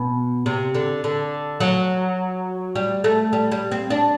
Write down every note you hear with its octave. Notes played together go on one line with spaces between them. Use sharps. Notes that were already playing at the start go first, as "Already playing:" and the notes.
Already playing: B2
C3
D3
D3
F#3
G3
A3
G3
G3
C4
D4